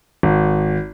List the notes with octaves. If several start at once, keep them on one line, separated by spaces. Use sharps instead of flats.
G#1